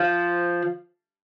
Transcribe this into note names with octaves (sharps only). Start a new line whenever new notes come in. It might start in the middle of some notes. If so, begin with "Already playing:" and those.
Already playing: F3